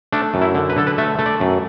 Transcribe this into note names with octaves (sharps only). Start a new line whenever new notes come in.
A3 D4
F#2
E4
D3
B4
D3 A4
B4
A3 E5
A3
D5
F#2